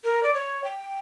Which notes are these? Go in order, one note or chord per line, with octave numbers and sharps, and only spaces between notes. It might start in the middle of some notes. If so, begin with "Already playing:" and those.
A#4
D5
C#5
G5